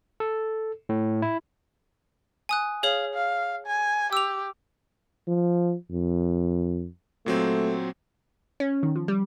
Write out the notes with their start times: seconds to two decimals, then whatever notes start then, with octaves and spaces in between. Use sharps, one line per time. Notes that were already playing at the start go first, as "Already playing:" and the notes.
0.20 A4
0.89 A2
1.22 E4
2.49 G#5 D#6 F#6
2.83 G#4 C#5 F5 F#7
3.14 F5
3.66 G#5
4.13 G4 E6 F7
5.28 F3
5.91 F2
7.26 A#2 F#3 A3 C4
8.60 C#4
8.83 D#3
8.96 F3
9.08 G3